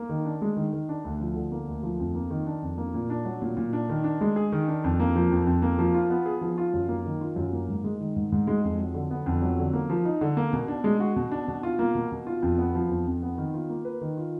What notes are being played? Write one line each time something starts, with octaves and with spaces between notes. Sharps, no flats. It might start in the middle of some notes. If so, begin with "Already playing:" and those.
Already playing: A#3
D#3
D4
G#3
D#3
D#3
D4
D2
F3
D3
A#3
D2
F3
F2
A#3
D#3
D4
F2
A#3
A#2
D4
F#3
A#2
A#2
D4
D#3
D4
G#3
G#4
D#3
D4
F2
A#3
F3
F2
F2
A#3
F3
F4
B3
G#4
F3
F4
F#2
A#3
D#3
F4
F#2
A#3
G#2
G#3
D#3
G#2
G#2
G#3
F2
F#3
D3
B3
F2
F#3
D3
A#3
F3
D#4
D3
A#3
B2
D4
G#3
F#4
B2
D4
B2
F4
A#3
B2
B2
F4
F2
B3
F3
F2
F2
B3
D#3
F4
A#3
B4
D#3
F4